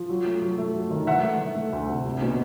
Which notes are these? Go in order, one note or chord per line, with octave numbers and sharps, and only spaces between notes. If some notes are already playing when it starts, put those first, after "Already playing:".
Already playing: F3
F#3
A3
F#3
A3
F#3
D#3
E3 E5 F#5
A3
A3
A3
D2
C3
C2
B2